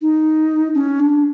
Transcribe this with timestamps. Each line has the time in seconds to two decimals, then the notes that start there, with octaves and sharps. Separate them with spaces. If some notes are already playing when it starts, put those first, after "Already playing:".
0.02 D#4
0.74 C#4
1.00 D4